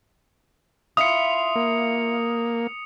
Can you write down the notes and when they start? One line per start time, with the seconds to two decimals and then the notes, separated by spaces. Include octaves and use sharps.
0.97 E4 F4 D#6 C#7
1.56 A#3